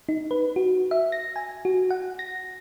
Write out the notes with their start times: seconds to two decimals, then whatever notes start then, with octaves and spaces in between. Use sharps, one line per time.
0.09 D#4
0.31 B4
0.56 F#4
0.91 E5
1.12 A#6
1.36 G#5
1.65 F#4
1.91 F#5
2.19 A#6